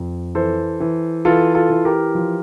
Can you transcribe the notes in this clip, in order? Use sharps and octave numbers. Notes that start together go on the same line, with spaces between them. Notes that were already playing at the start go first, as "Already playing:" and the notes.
Already playing: F2
E3 A4 C5
E3
E3 F4 A4
F4 A4
E3
G4 A#4
F3